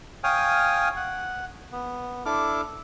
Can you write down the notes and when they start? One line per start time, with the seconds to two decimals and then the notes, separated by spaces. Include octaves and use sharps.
0.24 C#5 F5 G5 G#5 D#6 F6
0.96 F#5
1.72 B3
2.26 D4 E4 A4 D6 F6